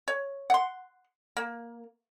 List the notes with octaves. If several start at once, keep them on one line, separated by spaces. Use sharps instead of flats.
C#5
F#5 C6
A#3